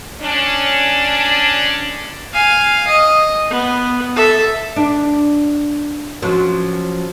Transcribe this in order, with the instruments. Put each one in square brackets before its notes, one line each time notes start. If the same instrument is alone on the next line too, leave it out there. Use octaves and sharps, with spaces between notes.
[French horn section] C#4 D4
[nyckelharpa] F5 G#5
D#5
B3
A4 E5
[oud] D4
F3 F#3 C#4